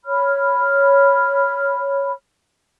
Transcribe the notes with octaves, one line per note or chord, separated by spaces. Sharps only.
C#5 B5 F6